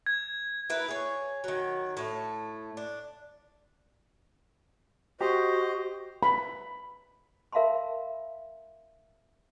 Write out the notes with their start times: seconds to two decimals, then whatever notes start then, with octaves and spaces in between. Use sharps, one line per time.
0.06 G#6
0.70 E4 A#4 B4
0.88 G#4 C#5
1.44 D#3 F#3
1.97 A2 A3
2.77 D4
5.20 F#4 G4 C5 D#5
6.23 B5
7.52 A#4 E5 F5 A5 B5 C6